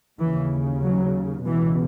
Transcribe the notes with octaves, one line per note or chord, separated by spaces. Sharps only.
D#2 C#3 E3
F#3
C#2 B2 E3